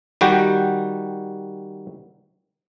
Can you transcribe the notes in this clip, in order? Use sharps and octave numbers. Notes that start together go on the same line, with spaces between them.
D#3 G3 F#4 G5